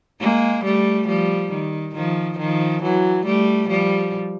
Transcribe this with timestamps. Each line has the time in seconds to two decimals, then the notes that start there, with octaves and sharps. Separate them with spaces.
0.20 G#3 A#3
0.64 G3 A3
1.07 F3 G3
1.52 D#3
1.95 D#3 F3
2.38 D#3 F3
2.82 E3 F#3
3.25 G3 A3
3.69 F3 G3